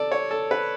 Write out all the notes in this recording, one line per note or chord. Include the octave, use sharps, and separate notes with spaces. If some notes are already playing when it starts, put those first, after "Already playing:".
Already playing: A4 D5
C#5
A4
B4